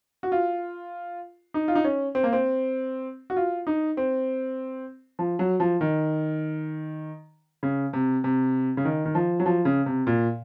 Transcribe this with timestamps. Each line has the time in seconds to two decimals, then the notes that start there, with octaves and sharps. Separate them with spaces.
0.23 F#4
0.32 F4
1.54 D#4
1.68 F4
1.75 D#4
1.84 C#4
2.15 C4
2.24 A#3
2.33 C4
3.30 F#4
3.36 F4
3.67 D#4
3.97 C4
5.19 F3
5.39 F#3
5.60 F3
5.81 D#3
7.63 C#3
7.93 C3
8.24 C3
8.77 C#3
8.85 D#3
9.05 D#3
9.15 F3
9.40 F#3
9.46 F3
9.65 C#3
9.86 C3
10.07 A#2